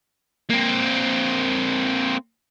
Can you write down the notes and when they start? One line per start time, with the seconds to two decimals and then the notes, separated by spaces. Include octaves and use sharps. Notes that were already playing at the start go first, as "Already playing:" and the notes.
0.50 A#3 C4